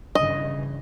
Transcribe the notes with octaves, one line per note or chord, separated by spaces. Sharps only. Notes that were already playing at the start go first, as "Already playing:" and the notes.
G2 C#3 E3 D#5